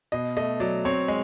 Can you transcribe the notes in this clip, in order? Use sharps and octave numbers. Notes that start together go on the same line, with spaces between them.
B2 D#5
A3 D#5
F#3 D5
C4 C#5
G#3